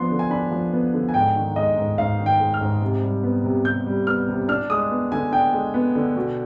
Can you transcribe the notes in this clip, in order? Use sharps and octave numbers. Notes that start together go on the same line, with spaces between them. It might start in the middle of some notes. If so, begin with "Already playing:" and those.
Already playing: F3 B3 D4 C6
D3
G#5
D4 B5
F3
B3
D3
G#5
G#2 G5
D#3
G#3 D#5
G#2
G#2 F5
D#3
G5
G#3
F6
G#2
C3
G3
B3
C3
C3 G6
G3
B3 F6
C3
D4 F6
G#3 D#6
B3
D3 G#5
D4 G5
G#3
B3
D3
B2